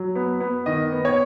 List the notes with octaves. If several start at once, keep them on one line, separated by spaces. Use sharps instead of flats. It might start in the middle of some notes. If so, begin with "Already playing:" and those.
Already playing: F#3
B3
B3
D#3 D#5
B3
C#5